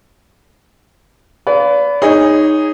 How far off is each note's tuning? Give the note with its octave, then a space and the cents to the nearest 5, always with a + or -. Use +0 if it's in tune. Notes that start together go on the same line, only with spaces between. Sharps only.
B4 +15 D5 -35 F5 +0
D#4 +0 G#4 -20 C#5 +0